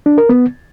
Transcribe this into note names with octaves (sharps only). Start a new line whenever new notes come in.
D4
A#4
B3